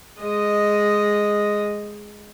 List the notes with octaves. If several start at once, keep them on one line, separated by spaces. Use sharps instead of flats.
G#3 D#5